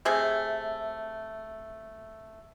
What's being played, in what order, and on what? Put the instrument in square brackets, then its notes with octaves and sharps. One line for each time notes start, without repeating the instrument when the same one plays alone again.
[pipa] C3 A3 G#4 E5